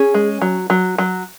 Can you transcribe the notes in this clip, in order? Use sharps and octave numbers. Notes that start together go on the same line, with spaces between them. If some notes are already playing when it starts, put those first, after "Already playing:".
Already playing: C#4 G#4
G#3
F#3
F#3
F#3